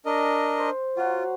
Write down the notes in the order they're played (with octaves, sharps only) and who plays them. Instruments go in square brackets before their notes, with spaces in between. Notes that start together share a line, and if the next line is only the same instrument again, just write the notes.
[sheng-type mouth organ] D4 A#4 D#5
[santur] C5
[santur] F#3 F#4 [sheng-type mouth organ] F4